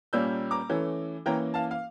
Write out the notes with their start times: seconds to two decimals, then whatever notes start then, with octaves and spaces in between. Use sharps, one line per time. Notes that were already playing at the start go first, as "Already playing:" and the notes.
0.13 A#2 G3 A#3 C#4 E6 G6
0.51 A#5 D6
0.70 E3 A3 C#4
1.26 E3 A#3 C#4 G5 A#5
1.54 F5 A5
1.71 F5